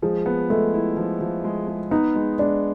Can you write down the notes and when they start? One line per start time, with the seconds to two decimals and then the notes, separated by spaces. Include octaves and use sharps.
0.02 F3 G#3
0.26 B3
0.50 G#3 A3
0.74 E4
0.97 F3
1.21 F3
1.44 G#3
1.68 G#3
1.91 B3 D#4
2.15 G#3
2.39 G#3 D4